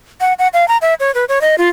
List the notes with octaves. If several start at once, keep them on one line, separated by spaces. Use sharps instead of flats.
F#5
F#5
F5
A#5
E5
C#5
B4
C#5
D#5
F4